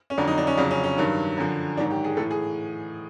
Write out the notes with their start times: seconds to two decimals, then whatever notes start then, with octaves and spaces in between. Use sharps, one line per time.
0.10 C#4
0.18 F2 D3 F#3 D4
0.27 D#4
0.38 D4
0.47 C#4
0.57 F2 C#3 F#3 D4
0.71 C#4
0.84 C#4
0.97 G2 D#3 F#3
1.37 F#2 D3 F3
1.77 G#2 D#3 F#3 D4
1.91 G4
2.04 G#4
2.17 A2 A4
2.20 E3
2.31 G#4